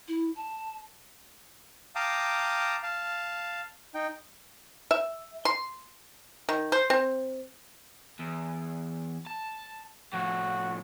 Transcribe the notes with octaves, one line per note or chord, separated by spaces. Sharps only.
E4
A5
F5 G5 A5 A#5 D6 D#6
F5 A5
D#4 G5
E5
C6
D#3
C5
C4
E2
A5
A2 F3 F#4